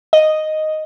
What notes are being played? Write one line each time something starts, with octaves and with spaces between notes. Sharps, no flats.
D#5